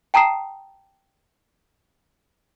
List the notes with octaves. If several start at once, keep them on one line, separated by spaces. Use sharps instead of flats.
G5 A5 A#5 D#6 C7 E7